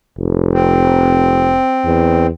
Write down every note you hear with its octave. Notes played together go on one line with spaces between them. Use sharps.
F1
C4
E2